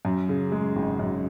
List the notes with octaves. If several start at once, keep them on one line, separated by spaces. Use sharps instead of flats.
F#2
C#3
G#3
G#1
F#2